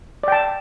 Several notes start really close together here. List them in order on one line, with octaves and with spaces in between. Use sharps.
D5 G5 A5